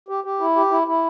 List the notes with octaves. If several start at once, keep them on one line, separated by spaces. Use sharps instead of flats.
G4
G4
E4
G4
E4
E4